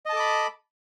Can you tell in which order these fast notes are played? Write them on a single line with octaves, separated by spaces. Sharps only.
D#5 A5 A4 D6 B5